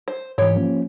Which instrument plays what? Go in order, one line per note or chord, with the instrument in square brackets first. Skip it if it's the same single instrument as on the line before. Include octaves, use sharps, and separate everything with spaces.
[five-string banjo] C5
[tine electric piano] G#2 E3 [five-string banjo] G4 C#5
[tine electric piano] F3 A#3 C#4